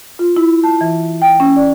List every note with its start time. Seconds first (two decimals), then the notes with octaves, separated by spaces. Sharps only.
0.19 F4
0.36 E4
0.64 A5
0.81 E3
1.22 G5
1.40 C#4
1.56 D5